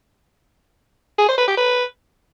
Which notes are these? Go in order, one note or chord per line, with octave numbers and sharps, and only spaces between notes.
G#4
C5
B4
G4
B4